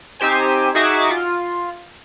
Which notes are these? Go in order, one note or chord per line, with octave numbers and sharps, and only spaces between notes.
C4 D#4 G4 C5 G#5
D#4 F#4 G#4 E5 C#6 D6
F4